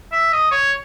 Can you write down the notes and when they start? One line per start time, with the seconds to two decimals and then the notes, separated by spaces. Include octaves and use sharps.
0.12 E5
0.32 D#5
0.52 C#5